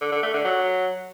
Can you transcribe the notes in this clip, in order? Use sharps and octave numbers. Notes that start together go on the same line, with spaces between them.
D3
D3
A3
D3
F#3